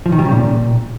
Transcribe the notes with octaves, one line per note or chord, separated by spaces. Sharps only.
F3
D#3
G3
C#3
A#2